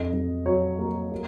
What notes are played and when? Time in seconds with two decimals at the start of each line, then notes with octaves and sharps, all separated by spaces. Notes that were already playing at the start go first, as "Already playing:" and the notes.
Already playing: F2 D#5
0.13 F2
0.46 F#3 C#5
0.79 A#3
1.12 A#3